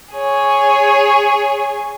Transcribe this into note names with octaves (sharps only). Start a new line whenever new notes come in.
G#4 C#5